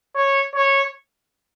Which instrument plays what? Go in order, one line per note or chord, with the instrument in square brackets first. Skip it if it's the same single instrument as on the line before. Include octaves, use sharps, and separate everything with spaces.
[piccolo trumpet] C#5
C#5